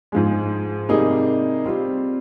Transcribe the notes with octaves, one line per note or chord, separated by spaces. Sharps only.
G#2 F3 G#3
C3 G3 A#3 D#4 G#4
G3 C4 F4